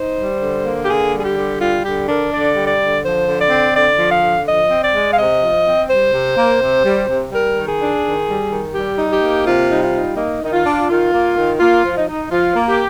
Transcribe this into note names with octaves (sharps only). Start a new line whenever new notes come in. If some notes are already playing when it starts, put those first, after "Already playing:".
Already playing: D#4 C5
G3
D3
A#3
G4
D3 G#4
G3
G#4
G4
D3
G3 F4
D3 G4
D4 A#4
D3 D5
G3
D5
D3
F3 C5
D3
D5
C4
D3 D5
F3
F5
D3
F3 D#5
C4
D5
G#3
F5
C3 D#5
F3
C4
G3 C5
C3
A#3
C3
G3
C3
G3 A#4
D#3
G#4
D4
D#3
G3
D#3
G3 G4
D#4
G4
A#3
C3 F4
G3 D#4
F4
D#4
A#3 D#4
D#3 D#4
F4
D4
D#3 F4
A#3
D#3
A#3 F4
F3
D#4
D#4
F3 F4
A#3
G4